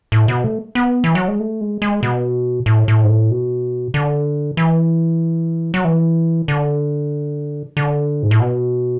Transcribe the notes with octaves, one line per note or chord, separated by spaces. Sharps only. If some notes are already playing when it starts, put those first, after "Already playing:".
A2
B2
A3
B3
E3
F#3
G#3
A3
G#3
G#3
B2
A2
A2
G#2
A2
B2
D3
E3
F#3
E3
D3
D3
G#2
A2
B2